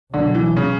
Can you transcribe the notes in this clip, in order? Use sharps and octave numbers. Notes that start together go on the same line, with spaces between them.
C#2 B2 D3 F#3
E3
C#3